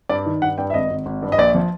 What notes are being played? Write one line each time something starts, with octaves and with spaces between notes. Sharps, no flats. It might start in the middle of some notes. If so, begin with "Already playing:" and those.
G2 D5
D#3
G2 F#5
G2 G5
E5
G#1 D#5
G#1
G#1
G2
D#5
A#1 D5
F3